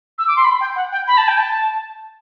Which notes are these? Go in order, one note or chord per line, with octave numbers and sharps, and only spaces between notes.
E6
D6
C6
B5
G5
F#5
G5
B5
A5
G5
A5